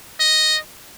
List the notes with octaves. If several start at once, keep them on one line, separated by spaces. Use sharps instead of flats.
D#5